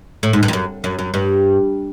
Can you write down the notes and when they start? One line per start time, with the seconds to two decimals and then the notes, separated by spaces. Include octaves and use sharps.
0.23 A2
0.33 G#2
0.43 G2
0.48 F2
0.53 F#2
0.84 F#2
0.99 F#2
1.14 G2